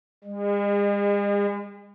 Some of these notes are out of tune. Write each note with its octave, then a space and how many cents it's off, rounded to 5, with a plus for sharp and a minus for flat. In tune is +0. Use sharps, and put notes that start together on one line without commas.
G#3 -45